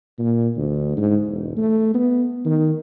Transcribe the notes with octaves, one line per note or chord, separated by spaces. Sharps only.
A#2
D2
G#2
E1
A3
B3
D#3